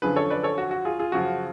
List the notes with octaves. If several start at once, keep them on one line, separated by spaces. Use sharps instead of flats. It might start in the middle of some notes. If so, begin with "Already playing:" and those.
F#2 D3 F3 G#4 B4
A4 C#5
B4 D5
A4 C#5
F#4
F#4
F4 G#4
F4 G#4
F#2 C#3 F3 F#4